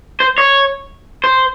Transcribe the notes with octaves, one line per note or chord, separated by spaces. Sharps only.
C5
C#5
C5